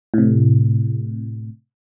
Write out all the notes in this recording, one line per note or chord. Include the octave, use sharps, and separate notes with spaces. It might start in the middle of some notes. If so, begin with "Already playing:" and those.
A2 C3